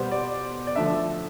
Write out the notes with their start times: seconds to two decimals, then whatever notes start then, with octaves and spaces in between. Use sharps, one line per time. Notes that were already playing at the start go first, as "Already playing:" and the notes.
Already playing: B2 G3 B3 C5
0.12 D5
0.67 D5
0.76 D3 F3 A3 D4 E5